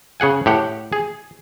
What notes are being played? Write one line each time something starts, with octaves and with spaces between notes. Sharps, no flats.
C#3 G#4 F#5 G#5
A2 G4 F#5
G#4